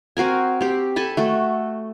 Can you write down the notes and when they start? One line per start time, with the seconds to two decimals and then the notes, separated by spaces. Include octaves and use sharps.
0.17 C4 F#4 A#4 G#5
0.61 C4 G4
0.96 A4 G#5 A5 B5
1.17 A3 F#4 A4